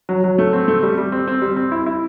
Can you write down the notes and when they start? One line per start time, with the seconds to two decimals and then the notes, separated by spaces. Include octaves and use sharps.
0.09 F#3
0.24 F#3
0.38 A3
0.53 C4
0.68 A3
0.83 G3
0.98 G3
1.12 C4
1.27 C4
1.42 G3
1.57 C4
1.72 E4
1.86 E4